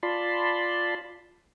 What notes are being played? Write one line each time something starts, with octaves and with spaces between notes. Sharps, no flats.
F4 D5 A5 B5 C6